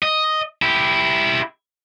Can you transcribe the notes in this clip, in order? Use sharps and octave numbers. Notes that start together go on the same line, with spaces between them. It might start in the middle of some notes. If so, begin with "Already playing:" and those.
D#5
E4 G4